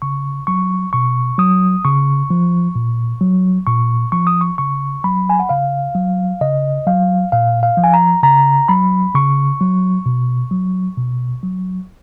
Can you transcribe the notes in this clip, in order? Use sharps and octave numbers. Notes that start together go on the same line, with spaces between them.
C#3 C#6
F#3 C#6
B2 C#6
F#3 D#6
C#3 C#6
F3
A#2
F#3
A#2 C#6
F3 C#6
D#6
C#6
C#3 C#6
F#3 B5
G#5
F#5
C#3 F5
F#3
C#3 D#5
F#3 F5
A#2 F5
F5
F3
G#5
A#5
C#3 A#5
F#3 B5
C#3 C#6
F#3
B2
F#3
B2
F#3